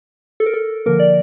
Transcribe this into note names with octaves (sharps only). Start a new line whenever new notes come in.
A4
A#4
A4
D3 F3 A#3 A#4
D5